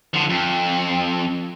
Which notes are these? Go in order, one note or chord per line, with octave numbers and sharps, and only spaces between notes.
D3 F3
F2